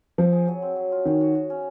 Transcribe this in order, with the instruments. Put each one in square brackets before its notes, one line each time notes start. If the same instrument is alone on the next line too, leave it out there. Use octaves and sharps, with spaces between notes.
[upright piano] F3 [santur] C4
[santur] G#4
F#3
C4
F#3
F4
[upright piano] D#3 [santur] C#5
[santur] F#4
F#4
C#4